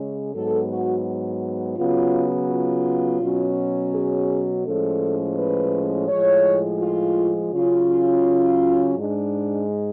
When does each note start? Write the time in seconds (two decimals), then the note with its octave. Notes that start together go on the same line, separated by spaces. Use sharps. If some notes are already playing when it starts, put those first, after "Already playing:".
Already playing: C#3 G#3 C#4
0.34 G#2 F#3 B3 A4
0.70 F#4
1.77 C#3 F#3 B3 F4
2.50 F4
3.21 B2 F#3 C#4
3.93 G#4
4.65 A2 F3 G#3 C#4 A4
5.37 B4
6.08 A2 F3 G#3 C#5
6.81 F4
7.52 C#3 F#3 C#4 F4
8.96 G#2 G#3 D4